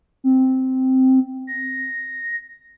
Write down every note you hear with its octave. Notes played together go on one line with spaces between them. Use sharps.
C4
A#6